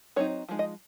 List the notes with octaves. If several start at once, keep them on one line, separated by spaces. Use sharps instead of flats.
F#3 C4 D#4 C#5
F3 G#3 D#4
D#5